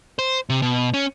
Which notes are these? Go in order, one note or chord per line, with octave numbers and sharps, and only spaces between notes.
C5
C3
B2
C#4